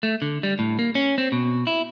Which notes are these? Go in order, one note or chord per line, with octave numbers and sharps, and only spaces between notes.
A3
D3
G3
A2
A#3
C#4
C4
B2
E4